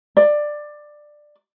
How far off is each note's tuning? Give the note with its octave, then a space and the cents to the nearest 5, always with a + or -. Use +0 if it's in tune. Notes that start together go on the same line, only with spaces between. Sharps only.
D5 +15